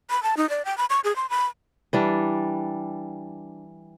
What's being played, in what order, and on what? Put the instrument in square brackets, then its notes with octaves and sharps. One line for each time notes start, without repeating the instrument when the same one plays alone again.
[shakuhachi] B5
A5
D#4
D5
G5
B5
C#6
G#4
C6
B5
[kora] E3 G3 D4